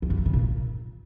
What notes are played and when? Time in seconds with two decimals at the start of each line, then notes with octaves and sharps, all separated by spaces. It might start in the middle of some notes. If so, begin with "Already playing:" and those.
0.02 E2
0.10 F#2
0.18 D#3
0.26 C#3
0.33 A#2